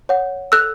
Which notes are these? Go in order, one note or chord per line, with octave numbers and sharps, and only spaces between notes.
C#5 F#5
A4 E6 F#6